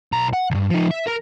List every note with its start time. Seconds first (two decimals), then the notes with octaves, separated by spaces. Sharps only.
0.12 B1 A#5
0.33 F#5
0.51 D2 G2
0.70 F3 D#4
0.91 E5
1.07 A#4 A#5